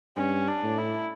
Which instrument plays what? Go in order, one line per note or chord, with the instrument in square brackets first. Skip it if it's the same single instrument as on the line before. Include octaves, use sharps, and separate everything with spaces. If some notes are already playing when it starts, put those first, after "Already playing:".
[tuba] G2 [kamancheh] C#4
[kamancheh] D4
[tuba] A2
[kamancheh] E4